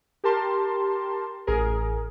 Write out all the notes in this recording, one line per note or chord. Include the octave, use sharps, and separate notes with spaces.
G4 A#4 A5 C6
A1 G#4 A#4